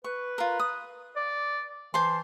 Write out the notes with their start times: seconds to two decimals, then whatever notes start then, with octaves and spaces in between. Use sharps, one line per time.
0.04 B4 C#6
0.38 F4 A#4
0.60 D#6
1.16 D5
1.94 E3 C5 A5 C6